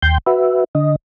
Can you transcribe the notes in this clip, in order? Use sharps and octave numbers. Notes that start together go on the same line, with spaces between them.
D#2 G5 C6 G6
F#4 B4 E5
D3 D#5